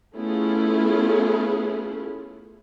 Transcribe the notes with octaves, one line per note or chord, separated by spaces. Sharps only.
A3 B3 C#4 E4 F4 G#4